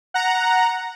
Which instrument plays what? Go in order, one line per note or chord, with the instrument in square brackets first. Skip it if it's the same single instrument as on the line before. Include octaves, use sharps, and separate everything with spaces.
[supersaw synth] F#5 A#5